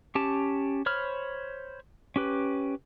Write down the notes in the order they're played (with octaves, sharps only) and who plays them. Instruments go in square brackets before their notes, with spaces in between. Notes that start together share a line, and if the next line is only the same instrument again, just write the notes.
[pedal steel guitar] C#4 G4 A5
C5 C#5 B5 F6
C#4 G4 B4